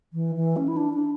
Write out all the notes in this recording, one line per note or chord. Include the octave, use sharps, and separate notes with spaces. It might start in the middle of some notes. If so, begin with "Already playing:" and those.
E3
E3
C#4
E4
D4
D4